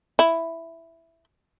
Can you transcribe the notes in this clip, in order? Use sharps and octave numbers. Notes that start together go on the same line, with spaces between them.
E4